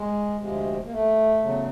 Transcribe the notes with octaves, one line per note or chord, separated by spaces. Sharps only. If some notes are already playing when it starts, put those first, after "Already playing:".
Already playing: G#3
D2 C3 F3 G#3
A#3
A3
E2 C#3 F#3